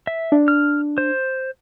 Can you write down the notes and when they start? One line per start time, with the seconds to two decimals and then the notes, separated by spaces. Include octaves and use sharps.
0.07 E5
0.32 D4
0.48 F6
0.98 C5